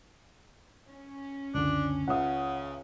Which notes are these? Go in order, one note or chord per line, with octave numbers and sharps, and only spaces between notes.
C#4
C#2 F#2 D3 D4
C#2 C#3 E5 F#5 D#6